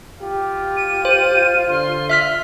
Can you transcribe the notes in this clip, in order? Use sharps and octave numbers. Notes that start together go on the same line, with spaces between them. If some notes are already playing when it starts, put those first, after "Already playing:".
F4 G4
D#7
C5
D3 C6
E5 F6 B6